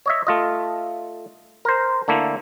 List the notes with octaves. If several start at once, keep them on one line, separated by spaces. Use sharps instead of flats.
C#5 D#5 E5
A3 F4 D#5
A#4 C5
D3 A3 A#3 E4